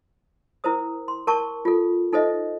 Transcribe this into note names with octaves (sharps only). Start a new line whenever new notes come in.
E4 A#4 C5 D#6
C6
A#4 A5 C#6
F4 A4
D#4 A4 C5 D#5 E5